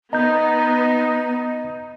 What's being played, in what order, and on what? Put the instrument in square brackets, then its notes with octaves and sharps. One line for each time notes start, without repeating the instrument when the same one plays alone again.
[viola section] B3 [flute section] D#4 [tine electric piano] D#5 G6 [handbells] A#5